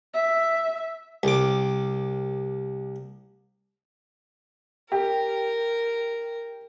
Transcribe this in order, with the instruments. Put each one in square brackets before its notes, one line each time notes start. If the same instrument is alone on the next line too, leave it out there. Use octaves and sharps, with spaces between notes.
[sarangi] E5
[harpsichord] C2 D6
[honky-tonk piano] G4 [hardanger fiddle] A#4